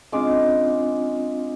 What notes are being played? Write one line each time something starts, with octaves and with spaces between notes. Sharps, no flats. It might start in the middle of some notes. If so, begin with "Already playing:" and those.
C#3 G#3 C4 D4 F4 D6